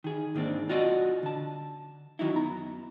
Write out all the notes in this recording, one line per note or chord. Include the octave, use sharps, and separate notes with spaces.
D#3 G#4
G#2 D#3 A#3 C4 D4
B1 A#2 F4 F#4 D5 D#5
D3 A5
D#3 F#3 D#4 E4
F#2 B3 A#5